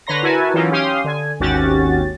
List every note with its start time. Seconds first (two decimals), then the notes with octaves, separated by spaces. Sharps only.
0.07 D3 B4 C#5 A#5 C6 A#6
0.23 E4 F#4 A#4 B4 G#5 A5
0.54 E3 F#3 C#4 D#4 F4
0.71 C#4 G4 F5 C6 D#6
1.04 D3 G#5
1.40 G#1 D#2 C#4 F#4 G4 A6